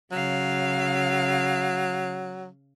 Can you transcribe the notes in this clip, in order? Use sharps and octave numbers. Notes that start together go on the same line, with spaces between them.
C#3 F#3 F5